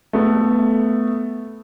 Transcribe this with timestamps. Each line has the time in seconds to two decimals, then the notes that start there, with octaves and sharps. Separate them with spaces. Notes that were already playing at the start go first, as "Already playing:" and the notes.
0.13 A3 B3